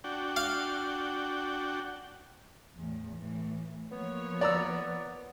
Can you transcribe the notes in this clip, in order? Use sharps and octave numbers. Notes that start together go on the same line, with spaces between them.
D4 F#4 G5
F5
E2 A2
A2 E3
F3 A#3 B3 C#5
D5 A#5 E6